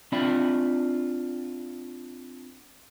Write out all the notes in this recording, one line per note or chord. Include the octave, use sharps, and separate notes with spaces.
C4 D4 F4 D5 E5 B5